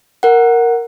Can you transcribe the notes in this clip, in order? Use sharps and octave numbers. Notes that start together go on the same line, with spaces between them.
A#4 F#5